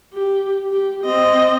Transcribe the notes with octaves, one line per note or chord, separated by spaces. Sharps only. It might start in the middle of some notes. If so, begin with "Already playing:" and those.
G4
G4
C4 D#5